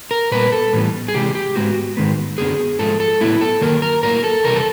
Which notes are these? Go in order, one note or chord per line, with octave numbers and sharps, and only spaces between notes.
A#4
A#2 G3 B3 B4
A4
A2 E3 G3 B3
G#4
C3 E3 G#3 G4
G4
G#2 D#3 G#3 B3 F#4
G#2 D#3 G#3 B3
F#2 D3 F#3 B3 G#4
G#2 F3 G#3 A4
A4
A2 F#3 B3 E4
A4
F#2 D#3 F#3 A#3 A#4
A#4
A2 F#3 A#3 A#4
A4
E2 C3 G3 A#4
A4